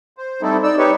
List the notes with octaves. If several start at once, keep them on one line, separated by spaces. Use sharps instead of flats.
C5
G3 A3 C4 D#4 E4 A4
D#4 D5 E6
D#4 G4 B4 C#5